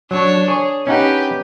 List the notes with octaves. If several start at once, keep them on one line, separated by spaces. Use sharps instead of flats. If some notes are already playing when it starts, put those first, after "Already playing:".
F#3 D4 C#5
G#4 C#5
C#4 D#4 G4 B4 F#5